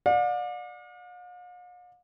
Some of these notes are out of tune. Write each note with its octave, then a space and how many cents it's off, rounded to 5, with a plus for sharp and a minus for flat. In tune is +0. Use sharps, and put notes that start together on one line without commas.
D5 +20 F5 +45